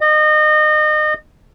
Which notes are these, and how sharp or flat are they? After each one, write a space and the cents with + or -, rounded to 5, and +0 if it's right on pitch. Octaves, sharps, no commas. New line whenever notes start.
D#5 -30